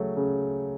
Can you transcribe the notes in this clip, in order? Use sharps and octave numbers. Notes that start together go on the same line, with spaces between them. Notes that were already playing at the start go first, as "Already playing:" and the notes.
Already playing: C#3 F#3 A3
C#3